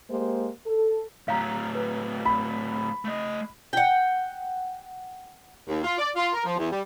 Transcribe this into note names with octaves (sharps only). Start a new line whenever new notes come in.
G#3 A#3 G4 G#4 C5
A4
A2 F#3 F5 A#5
B4
B5
A3 D#5
F#5 G5
D#2
F4
D5
F4
A#4
F3
E2
G3